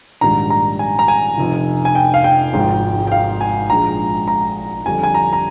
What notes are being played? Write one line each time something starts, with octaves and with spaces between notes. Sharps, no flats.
A#1 G#2 D#3 G3 A#5
A#5
G#5
A#5
G#5
F1 F2 C3
G#5
G5
F5
G5
G#1 G#2 F3 G#3
G5
F5
G#5
A#1 G#2 F3 G#3 A#5
A#5
F2 D3 G3 G#5
G#5
A#5
A#5